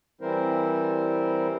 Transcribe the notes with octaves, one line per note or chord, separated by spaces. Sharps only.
E3 G3 C4 E4 A#4 C5